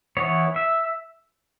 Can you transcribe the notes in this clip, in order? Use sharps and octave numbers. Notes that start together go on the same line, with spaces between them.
E3 B3 C#5
E5